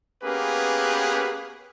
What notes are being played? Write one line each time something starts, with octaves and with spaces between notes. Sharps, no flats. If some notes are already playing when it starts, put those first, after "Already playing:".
A#3 B3 C#4 G4 G#4 B4